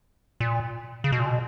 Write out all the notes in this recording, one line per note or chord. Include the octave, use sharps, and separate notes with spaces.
A#2
C#3
B2
A#2
B2